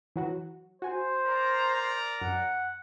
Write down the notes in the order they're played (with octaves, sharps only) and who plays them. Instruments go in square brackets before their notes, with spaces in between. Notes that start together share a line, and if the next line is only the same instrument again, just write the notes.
[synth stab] E3 F#3 F#4
[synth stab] F#4 G#5 [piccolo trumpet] C5
[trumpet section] A#4 D5 A#5
[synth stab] F#2 [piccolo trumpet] F#5